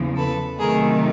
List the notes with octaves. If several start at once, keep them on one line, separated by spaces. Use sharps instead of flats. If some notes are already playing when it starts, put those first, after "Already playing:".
Already playing: E2 C#3 F3
A4 B4
C3 D#3 F#3 A3 G#4 A#4